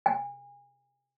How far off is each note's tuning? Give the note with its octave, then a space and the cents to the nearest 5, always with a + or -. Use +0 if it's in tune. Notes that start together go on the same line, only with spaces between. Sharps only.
G#5 -35